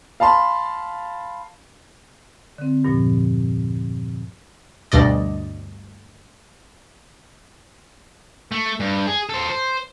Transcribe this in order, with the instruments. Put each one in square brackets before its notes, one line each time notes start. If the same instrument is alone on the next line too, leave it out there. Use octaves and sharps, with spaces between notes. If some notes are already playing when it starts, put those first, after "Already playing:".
[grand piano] F5 A5 B5 C6
[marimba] D3 C4
E2 G2 A#2 F3
[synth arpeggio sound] D2 G2 B2 D5 D#5
[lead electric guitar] A3
G2
G#4
A4 C5
C5